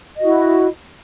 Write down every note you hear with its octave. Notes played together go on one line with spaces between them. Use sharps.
E4 F#4 D#5